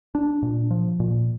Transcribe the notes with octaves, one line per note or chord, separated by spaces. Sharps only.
D4
A#2
F3
A#2